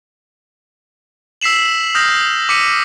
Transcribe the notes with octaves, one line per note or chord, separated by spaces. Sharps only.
E6 B6 C7 E7 F#7
D#6 F6 G6 A#6
D6 B6 C#7 D#7